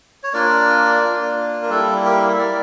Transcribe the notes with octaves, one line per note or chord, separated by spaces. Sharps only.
C#5
A#3 D4 F4 A#4 D5
A#3 D4 F4
A#4
G3 A#3 E4 A4
G4 A#4
F5
E5
G3 A#3 E4 A#4 D5